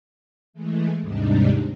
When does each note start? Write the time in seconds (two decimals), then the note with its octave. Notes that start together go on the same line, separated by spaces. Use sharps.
0.53 E3 G#3 A3
1.00 D#2 G#2 C3 G3 D4 D#4